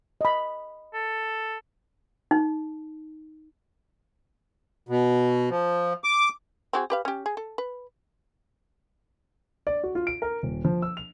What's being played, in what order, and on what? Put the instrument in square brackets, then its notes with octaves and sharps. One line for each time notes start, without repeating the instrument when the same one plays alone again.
[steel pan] D#5 B5
[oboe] A4
[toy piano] D#4
[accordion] B2
F3
D6
[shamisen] C4 F#4 G#4
G4 B4 F5
C#4 G4
G#4
A4
B4
[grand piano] D5
F#4
F4
D7
A#4
D#1
F3
E6
F7